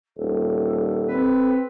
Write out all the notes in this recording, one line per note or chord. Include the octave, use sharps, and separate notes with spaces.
D#1 A4
C4 B4